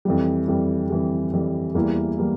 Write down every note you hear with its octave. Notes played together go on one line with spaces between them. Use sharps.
F2 E3 G3
F2 E3 G3
F2 E3 G3
F2 E3 G3
E2 E3 G3 A#3 E4
E3 G3 A#3 E4